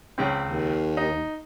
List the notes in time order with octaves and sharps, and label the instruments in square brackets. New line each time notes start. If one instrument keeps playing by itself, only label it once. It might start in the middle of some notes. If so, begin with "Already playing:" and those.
[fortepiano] C#2 C#3 C4
[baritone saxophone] D#2
[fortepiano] D#4